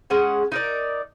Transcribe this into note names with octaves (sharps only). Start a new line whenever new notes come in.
G#3 C#4 F#5
D#4 A#4 D5